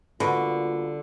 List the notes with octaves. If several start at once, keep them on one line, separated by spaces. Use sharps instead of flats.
B2 D3 G3 A#3 F4